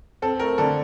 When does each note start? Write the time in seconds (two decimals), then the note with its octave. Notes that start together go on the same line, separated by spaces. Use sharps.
0.22 C4 A4
0.40 A3 A#4
0.58 D3 A4